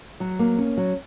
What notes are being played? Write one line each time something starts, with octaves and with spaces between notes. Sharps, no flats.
F#3
A#3
C#4
F#3